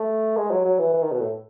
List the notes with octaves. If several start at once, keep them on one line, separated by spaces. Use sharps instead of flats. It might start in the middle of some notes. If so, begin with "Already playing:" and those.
Already playing: A3
G#3
F#3
F#3
E3
E3
D#3
B2
A2